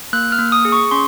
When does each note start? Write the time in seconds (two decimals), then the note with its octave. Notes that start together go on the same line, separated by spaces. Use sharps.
0.13 A#3 F#6
0.32 F6
0.39 A#3
0.52 D#6
0.65 G#4
0.72 C#6
0.91 C#4 C6